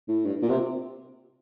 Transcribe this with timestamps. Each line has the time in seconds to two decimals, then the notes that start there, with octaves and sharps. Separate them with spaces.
0.08 A2
0.25 G2
0.42 A#2
0.50 C3